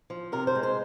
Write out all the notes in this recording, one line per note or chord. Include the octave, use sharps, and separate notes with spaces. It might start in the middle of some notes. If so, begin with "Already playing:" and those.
F3
C3 A#4
C5
G#3
C5